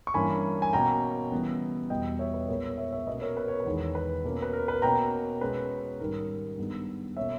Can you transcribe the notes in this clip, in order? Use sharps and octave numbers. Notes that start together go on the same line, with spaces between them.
C#6
G2 E3 A#3 C#4 G#5 B5
G#5
B2 A#3 C#4 G5 A#5
C#3 E3 G3 B3
E2 B2 G3 D#5 G5
C#5 E5
B4
A#2 G#3 B3 A#4 C#5
C#5 E5
C#5 E5
B2 A#3 C#4 B4 D#5
A#4 C#5
B4
C#5
B4
E2 D#3 G#3
B4
B2 A#3 C#4
B4
A#4
B4
B2 A#3 C#4 G5 A#5
B2 G#3 C#4 B4
G#2 D#3 G3 C#4 A#4
G2 D#3 G#3 B3
B2 A#3 C#4 C#5 E5